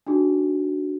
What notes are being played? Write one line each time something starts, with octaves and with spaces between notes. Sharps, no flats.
D4 D#4 F#4 G#4